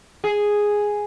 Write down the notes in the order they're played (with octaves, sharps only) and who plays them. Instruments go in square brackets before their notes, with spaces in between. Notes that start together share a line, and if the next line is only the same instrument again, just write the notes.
[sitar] G#4